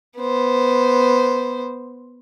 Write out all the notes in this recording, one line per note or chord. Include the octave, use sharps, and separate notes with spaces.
B3 C5